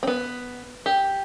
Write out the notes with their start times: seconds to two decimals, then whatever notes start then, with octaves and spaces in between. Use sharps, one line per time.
0.03 C4
0.07 B3
0.86 G4